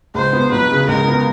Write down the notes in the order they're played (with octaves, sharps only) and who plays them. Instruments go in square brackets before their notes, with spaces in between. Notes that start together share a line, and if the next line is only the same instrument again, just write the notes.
[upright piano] C#2 [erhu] C5
[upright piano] B3
[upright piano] F#3 [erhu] B4
[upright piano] C#3
[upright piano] C#2 [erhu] A#4
[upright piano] B3